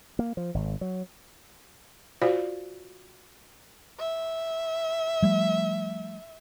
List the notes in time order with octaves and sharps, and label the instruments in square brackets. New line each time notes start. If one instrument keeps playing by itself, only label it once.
[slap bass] A#3
F3
G#1
F#3
[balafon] F4 F#4 C5 D5 F5
[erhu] E5
[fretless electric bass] F3 G3 A3